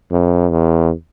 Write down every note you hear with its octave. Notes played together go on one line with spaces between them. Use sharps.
F2
E2